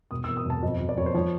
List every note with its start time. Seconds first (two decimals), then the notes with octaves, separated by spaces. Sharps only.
0.11 E1 D#6
0.24 E2 E6
0.37 D#6
0.45 E1 A5
0.63 F2 D#5
0.80 F2
0.89 D5
0.97 F2 C#5
1.06 C5
1.14 F3 C#5